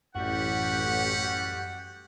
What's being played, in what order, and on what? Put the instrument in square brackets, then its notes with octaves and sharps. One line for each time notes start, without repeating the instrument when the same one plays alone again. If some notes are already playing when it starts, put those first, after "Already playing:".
[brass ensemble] A1 [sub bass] F#2 [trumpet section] G3 G4 F#5 [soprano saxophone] F#4